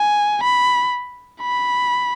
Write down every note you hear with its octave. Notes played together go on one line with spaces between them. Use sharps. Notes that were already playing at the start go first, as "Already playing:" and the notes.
Already playing: G#5
B5
B5